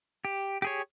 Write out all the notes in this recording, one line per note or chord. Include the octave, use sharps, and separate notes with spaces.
G4
G4 G#4 C#5